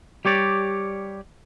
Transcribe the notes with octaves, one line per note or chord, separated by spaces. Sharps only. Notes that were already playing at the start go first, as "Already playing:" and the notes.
G3 G4 C#5 D5